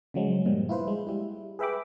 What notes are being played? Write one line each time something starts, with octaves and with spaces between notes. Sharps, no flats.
C#3 F3 F#3 G#3
G2 A#2 F3 G3
E4 F4 B4 C5
G#3
G3 E4
G#4 B4 E5 G5 B5 D6